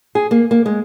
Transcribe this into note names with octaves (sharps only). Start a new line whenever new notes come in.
G#4
A#3
A#3
G#3